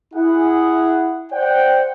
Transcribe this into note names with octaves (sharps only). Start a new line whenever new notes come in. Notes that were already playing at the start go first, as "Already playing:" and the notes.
E4 G#4 F#5
C5 D5 F#5 G5